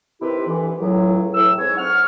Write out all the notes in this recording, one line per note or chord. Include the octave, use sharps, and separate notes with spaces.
C3 D#3 E4 G4 B4
D2 E3
C#2 A2 F#3
A2 E3 E6
G#2 C4 C#5
F#5 C#6 F6